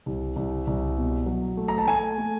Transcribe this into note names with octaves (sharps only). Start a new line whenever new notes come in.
C2
C2
C2
B2
F#3
A3
A#5
A5
A3 G#5
A3